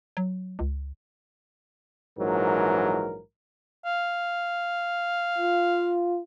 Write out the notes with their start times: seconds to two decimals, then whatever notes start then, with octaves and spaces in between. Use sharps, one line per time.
0.17 F#3
0.59 C#2
2.19 A#1 G#2 E3 F#3 A#4
3.85 F5
5.38 F4